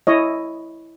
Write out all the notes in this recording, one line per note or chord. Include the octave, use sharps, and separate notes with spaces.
E4 C#5 D#5